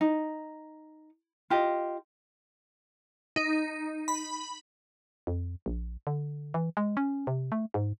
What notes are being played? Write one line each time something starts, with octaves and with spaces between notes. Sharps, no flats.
D#4
F4 G4 D#5
D#4
B5
F2
A#1
D3
E3
G#3
C#4
C3
A3
G#2